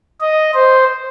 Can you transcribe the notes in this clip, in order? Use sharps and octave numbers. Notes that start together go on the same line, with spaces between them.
D#5
C5